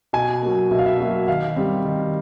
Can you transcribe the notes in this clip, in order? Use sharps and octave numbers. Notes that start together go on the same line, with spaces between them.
B2 G#5
F#3 A#3
B2 E5
F5
E5
F#3 A#3
D#3 F5
G3 C4
D#3